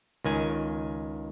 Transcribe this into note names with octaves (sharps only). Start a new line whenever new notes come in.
C#2 D#3 G#5